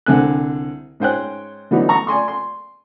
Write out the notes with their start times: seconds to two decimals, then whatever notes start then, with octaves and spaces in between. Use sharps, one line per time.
0.06 C2 D3 C4 G#5 F#6
1.00 G#2 C#4 C5 G5 G#5 F#6
1.71 D3 E3 F#3 B3 D4 D#4
1.89 A#5 C#6
2.07 D5 G#5 C6 C#6
2.28 C6